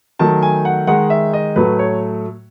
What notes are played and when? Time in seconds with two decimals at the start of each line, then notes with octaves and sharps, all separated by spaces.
0.19 D#3 F#3 A3 A5
0.42 G#5
0.65 F#5
0.87 D#3 G#3 F#5
1.10 E5
1.33 D#5
1.56 A2 F#3 A3 B4
1.79 C#5